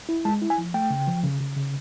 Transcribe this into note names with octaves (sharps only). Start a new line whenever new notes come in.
E4
G#3 A5
E4
G#5
F3
A3 G5
C#3
F3
C#3
C#3
C#3